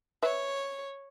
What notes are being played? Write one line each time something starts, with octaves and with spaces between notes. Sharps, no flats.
B4 C#5 E5